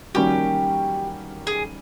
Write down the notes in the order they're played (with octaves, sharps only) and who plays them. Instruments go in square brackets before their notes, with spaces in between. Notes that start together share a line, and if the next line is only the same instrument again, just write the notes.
[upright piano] D#3 G3 A#3 C#4 F#4 [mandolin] G4
[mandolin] G#4